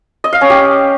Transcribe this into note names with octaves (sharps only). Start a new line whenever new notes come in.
D#5
F5
C#4
G4